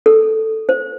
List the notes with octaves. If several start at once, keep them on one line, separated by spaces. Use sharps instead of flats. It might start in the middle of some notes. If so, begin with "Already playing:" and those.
A4
C5